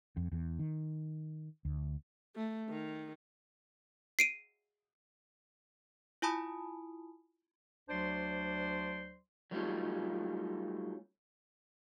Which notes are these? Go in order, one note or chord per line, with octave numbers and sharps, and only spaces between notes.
F2
E2
D#3
D2
A3
D#3
C7 D7 D#7
E4 F4 G#5 A5 B5 D#6
D2 F#3 D4 C5 D5 C6
F#3 G3 A3 C#4 D#4 F4